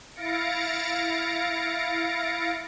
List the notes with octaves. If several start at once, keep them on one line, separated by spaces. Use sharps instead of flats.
E4 F5 A6 A#6 C#7 D7